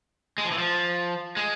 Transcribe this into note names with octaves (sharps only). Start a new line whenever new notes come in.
G#3
F3
E3
F3
G#3